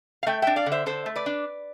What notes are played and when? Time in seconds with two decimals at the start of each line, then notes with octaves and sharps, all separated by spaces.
0.23 F5
0.27 A3 E5 G5
0.42 D4 E5 G5
0.56 D5 F5
0.66 D3
0.72 C5 E5
0.86 D3 A4 C5
1.06 A3
1.16 B4 D5
1.26 D4